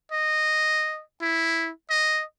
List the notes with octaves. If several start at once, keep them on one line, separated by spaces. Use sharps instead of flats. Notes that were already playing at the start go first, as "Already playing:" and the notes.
D#5
E4
D#5